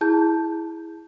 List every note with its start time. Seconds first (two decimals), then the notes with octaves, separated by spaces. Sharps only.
0.01 E4 G#4 A5 G6